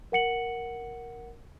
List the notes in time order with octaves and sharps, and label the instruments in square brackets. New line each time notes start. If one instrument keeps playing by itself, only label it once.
[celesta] A#4 F#5 C#7 F#7